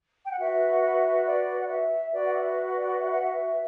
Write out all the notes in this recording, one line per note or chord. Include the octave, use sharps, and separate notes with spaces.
G5
F#5
F#4 B4 E5
F#5
E5
D5
F#5
E5
F#4 B4 D5
F#5
E5
D5
E5
F#5
E5